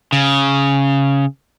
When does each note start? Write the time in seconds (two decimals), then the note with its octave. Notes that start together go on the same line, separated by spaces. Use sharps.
0.13 C#3